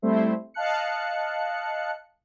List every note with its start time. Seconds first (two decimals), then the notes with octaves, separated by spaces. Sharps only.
0.02 G3 A3 C4 E4 C5 E5
0.54 D#5 F5 A5 F#6 C#7